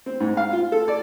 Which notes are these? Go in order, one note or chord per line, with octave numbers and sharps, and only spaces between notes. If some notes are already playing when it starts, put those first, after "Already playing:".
C4
G#2
F5
F4
A4
D5